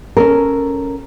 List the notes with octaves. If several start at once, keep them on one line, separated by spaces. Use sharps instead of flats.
C#4 A4 A#4